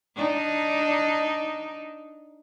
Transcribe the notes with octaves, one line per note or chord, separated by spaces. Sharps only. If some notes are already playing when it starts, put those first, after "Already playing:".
D4 D#4